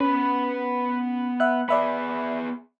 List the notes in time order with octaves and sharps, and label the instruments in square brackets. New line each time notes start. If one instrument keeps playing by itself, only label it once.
[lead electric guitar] B3 B4 [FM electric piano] C#4
[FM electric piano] E5 F#5 F#6
[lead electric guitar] B3 G#4 [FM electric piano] D5 E5 B5